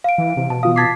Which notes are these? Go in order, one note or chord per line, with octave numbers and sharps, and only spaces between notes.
F5 D7
E3
C3
B2 A5
E3 F4 F5 D#6
A5 D6 G#6 A6 B6 C7